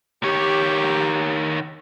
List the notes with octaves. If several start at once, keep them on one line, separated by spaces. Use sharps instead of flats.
D#3 G4 C#5